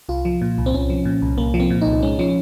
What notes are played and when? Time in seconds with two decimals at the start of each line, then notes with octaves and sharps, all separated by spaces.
0.09 C2 F4
0.25 F3
0.41 A#2
0.58 C2
0.66 C4
0.74 C2 C#4
0.90 F3
1.05 A#2
1.22 C2
1.38 C2 A#3
1.54 F3
1.60 C4
1.70 A#2
1.82 D#4
1.87 C2
2.02 G#3 C#4
2.19 F3 C#4